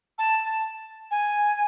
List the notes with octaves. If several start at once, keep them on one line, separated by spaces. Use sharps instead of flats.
A5
G#5